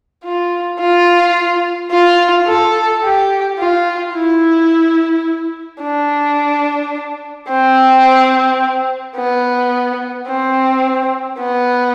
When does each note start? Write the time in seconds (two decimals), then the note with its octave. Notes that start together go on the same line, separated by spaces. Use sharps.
0.24 F4
0.79 F4
1.91 F4
2.47 A4
3.03 G4
3.59 F4
4.13 E4
5.81 D4
7.49 C4
9.16 B3
10.27 C4
11.39 B3